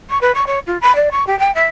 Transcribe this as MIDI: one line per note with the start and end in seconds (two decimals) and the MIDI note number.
0.10 0.20 85
0.21 0.31 71
0.34 0.44 85
0.46 0.59 73
0.66 0.77 65
0.81 0.95 83
0.95 1.09 74
1.11 1.26 85
1.27 1.37 67
1.39 1.53 79
1.54 1.68 76